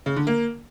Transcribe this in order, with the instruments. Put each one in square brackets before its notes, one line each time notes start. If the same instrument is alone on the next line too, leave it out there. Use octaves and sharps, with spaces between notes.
[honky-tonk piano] C#3
D3
A#3